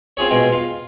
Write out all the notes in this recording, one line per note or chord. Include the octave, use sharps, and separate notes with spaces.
C4 F4 G#4 C#5
B2 G#3 F4 G5 G#5
F4 F5